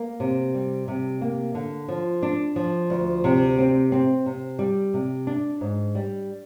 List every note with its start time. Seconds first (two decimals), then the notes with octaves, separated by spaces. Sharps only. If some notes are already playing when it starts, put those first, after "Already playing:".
Already playing: A#3
0.20 C3
0.54 G3
0.88 C3
1.21 A#3
1.54 D3
1.88 F3
2.23 D4
2.56 F3
2.90 D2
3.24 C3
3.58 C4
3.92 C4
4.26 C3
4.59 G3
4.94 C3
5.27 D4
5.61 G#2
5.95 G3